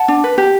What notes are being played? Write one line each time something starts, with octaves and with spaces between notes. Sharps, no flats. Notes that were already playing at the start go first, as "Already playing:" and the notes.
Already playing: F#5 A5
D4
B4
G4